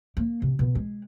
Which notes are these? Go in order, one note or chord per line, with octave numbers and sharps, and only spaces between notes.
A#3
C3
B2
G#3